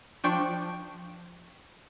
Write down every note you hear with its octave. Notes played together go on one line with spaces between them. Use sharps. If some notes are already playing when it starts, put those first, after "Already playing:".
F3 D4 G5 C#6 D7